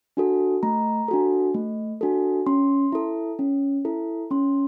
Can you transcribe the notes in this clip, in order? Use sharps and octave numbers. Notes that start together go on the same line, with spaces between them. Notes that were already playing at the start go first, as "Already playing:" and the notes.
D4 F#4 A4
A3 A#5
D4 F#4 A4
A3
D4 F#4 A4
C#4 C6
E4 A4
C#4
E4 A4
C#4 C6